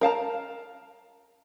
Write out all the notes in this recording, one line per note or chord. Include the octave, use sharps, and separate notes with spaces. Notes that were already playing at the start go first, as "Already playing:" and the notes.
A#4 F5 A5 A#5